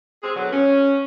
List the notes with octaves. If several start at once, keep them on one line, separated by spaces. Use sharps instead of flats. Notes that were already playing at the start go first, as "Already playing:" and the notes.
G#3 C4 G#4
B2 D3 F#3
C#4